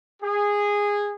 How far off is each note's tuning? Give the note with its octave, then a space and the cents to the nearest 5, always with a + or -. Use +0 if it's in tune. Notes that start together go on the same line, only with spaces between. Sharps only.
G#4 -15